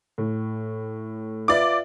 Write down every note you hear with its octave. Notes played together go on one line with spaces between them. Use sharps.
A2
F4 B4 D5 E5 D6